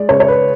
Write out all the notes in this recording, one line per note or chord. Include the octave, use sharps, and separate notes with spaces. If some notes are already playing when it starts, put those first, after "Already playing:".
Already playing: G#3 D5
C#3 C#5
C#5
B4